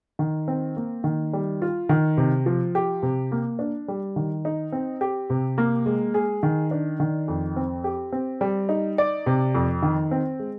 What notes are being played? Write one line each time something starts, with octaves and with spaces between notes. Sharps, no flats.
D#3
C4
A#3
D#3
G3
F4
D#3
C3
F3
G4
C3
A#3
D4
G3
D#3
D#4
C4
G4
C3
A#3
G#3
G#4
D#3
D4
D#3
F2
C4
G4
C4
G3
D#4
D5
C3
F2
D#3
C4
G#3